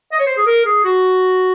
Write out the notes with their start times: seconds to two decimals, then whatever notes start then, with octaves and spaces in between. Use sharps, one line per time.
0.12 D#5
0.19 C#5
0.27 C5
0.37 G#4
0.46 A#4
0.66 G#4
0.84 F#4